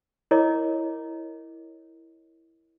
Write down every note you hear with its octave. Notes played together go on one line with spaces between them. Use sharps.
E4 A#4 C#5 D#5 D6